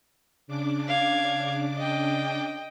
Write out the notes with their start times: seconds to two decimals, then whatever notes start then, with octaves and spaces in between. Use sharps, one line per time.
0.47 C#3 D4 D6
0.88 F5 G#6
1.78 D#5 G5